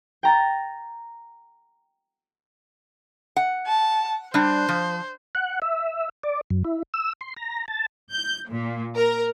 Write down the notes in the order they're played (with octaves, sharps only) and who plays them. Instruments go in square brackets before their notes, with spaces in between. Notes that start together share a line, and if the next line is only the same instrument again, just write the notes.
[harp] G5 A#5 A6
[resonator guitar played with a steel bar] F#5
[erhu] A5
[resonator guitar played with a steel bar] G3 D4 [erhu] C5
[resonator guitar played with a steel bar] F3
[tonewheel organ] F#5
E5
D5
F#2
E4
E6
C6
A#5
A5
[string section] G6
A#2
A#4